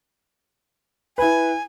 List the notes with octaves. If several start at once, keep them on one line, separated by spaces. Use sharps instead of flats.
E4 B4 G#5